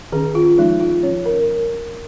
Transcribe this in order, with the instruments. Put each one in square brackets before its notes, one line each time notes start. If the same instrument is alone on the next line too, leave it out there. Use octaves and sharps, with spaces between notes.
[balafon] D#3 C#4 G#4
F4
F3 G#3 C#4 D#4
F4
F3 G#3 C#4 C#5
A#4